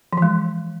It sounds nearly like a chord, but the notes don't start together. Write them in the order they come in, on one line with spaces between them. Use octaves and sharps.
F3 E3 G#3